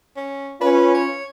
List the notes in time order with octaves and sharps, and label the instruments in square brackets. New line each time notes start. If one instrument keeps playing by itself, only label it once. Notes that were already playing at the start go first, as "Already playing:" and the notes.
[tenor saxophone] C#4
[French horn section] C#4 F4 [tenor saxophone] B4
[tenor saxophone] C#5